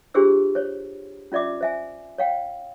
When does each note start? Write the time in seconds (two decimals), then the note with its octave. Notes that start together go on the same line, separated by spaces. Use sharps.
0.14 D4 F4 G4 G#4 C5 E6
0.55 C5 C#5
1.32 C#4 F4 D5 E5 D6
1.61 C5 E5 G#5
2.18 C#5 F5 G5